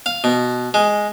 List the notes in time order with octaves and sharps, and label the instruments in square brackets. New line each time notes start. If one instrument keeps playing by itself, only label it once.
[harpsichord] F5
B2
G#3